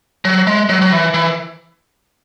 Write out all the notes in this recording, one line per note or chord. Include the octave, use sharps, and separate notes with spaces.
F#3
G#3
F#3
F#3
E3
E3